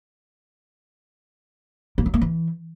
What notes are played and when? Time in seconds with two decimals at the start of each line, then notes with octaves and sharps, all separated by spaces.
1.98 A#3
2.06 F#3
2.14 A#3
2.22 E3